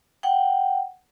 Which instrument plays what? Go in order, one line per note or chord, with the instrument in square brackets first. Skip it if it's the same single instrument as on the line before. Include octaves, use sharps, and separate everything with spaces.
[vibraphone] F#5 G5